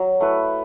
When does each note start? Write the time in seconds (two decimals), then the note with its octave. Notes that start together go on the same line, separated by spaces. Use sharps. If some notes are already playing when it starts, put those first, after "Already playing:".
Already playing: F#3
0.20 A3 E4 B4